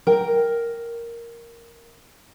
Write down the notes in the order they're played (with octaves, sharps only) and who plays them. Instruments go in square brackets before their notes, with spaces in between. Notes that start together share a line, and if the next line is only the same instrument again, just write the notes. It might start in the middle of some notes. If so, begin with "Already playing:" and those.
[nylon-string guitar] A#4 G5